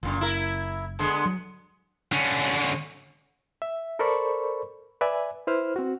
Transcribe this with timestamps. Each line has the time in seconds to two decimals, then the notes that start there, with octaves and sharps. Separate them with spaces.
0.03 F#1 A#2 C#3
0.21 E4 A#4
0.99 D3 G#3 B3
1.26 F#3
2.12 D3 C#4
3.62 E5
3.99 A4 A#4 C5 D5 B5 C#6
5.01 B4 D5 E5 G#5
5.47 E4 B4 C5 F6
5.76 C4 F#4